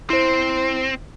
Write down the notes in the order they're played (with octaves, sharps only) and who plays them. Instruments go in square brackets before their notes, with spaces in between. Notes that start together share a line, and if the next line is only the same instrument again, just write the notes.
[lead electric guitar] C4 [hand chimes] E4 C5